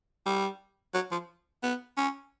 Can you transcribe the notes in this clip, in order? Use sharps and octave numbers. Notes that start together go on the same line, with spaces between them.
G3
F#3
F3
B3
C#4